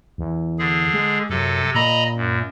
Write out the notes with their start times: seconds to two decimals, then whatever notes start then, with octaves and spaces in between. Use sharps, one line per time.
0.18 E2
0.59 D3 G#4
0.94 G#3
1.30 F#2 C3 A4
1.75 A#2 D#5 A#5 B5
2.17 F#2